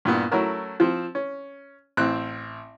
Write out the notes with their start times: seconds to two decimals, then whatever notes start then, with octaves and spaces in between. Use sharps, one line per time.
0.05 G2 A#2 B3
0.32 F#3 A3 C#4 E4 F#4 A#4
0.80 F3 C4
1.15 C#4
1.97 A1 C4 F#6